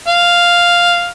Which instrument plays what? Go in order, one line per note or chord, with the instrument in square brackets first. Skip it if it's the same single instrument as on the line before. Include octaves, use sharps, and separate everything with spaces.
[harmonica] F5